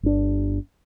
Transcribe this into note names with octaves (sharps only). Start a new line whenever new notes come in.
G1 D4